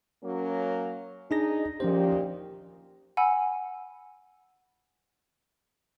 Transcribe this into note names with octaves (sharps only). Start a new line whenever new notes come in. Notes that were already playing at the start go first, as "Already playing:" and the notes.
F#3 A#3 C#4
D4 D#4 G#4 A#6
A#2 D#3 F3 C#4 G4 C5
F#5 G#5 B5 E6